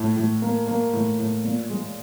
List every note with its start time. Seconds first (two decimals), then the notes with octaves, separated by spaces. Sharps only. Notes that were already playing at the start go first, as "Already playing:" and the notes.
Already playing: A2
0.16 A2
0.42 A#3
0.68 A#3
0.93 A2
1.19 A2
1.44 A#2
1.70 G#3